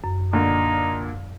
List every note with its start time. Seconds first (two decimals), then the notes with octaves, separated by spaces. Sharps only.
0.04 F#2
0.33 A#2 D3 D#4